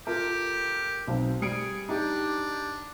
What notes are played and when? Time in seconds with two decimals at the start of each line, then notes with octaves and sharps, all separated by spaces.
0.07 F4 G4 A4 A#4
1.08 B1 C4
1.42 G3 G#4 C#7 D7
1.89 D4 D#4 G4